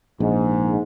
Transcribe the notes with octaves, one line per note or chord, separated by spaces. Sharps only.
A#1 G#2